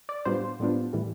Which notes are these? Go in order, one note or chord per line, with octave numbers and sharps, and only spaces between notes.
D5
A2 G3 B3 D4 F4 C5
A2 G3 B3 D4 F4
A2 E3 G3